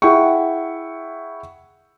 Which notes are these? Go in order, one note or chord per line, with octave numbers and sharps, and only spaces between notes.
E4 G#4 F#5 G5 C#6